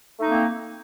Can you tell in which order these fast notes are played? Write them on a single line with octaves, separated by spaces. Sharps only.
A3 D#4 A#3 C4